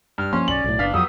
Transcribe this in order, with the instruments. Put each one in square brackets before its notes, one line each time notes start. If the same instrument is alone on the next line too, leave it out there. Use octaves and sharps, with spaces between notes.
[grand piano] G2 [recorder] F6
[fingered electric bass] F3 A#3 [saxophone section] C#4 [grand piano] C6
[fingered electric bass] B1 [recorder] D5 [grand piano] F#7
[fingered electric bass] B1 A2
[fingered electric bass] F#1 [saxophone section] B3 D4 [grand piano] F5 B6
[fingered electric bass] F2 F#3 [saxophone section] D#3 G3 B3 [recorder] D#6 [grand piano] E6